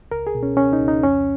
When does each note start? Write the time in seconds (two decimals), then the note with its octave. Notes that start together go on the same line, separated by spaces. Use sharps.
0.11 C#2 A#4
0.27 G#4
0.35 B2
0.43 C#4
0.57 C#2 C#4
0.73 D#4
0.81 C#2
0.88 D#4
1.03 F2 C#4